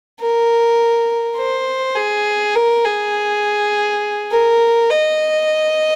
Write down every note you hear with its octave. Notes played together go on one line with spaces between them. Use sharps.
A#4
C5
G#4
A#4
G#4
A#4
D#5